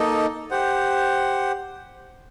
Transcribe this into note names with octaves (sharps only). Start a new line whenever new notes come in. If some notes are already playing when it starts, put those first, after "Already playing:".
Already playing: A#3 D#4 A4 D#5
G4 C5 F#5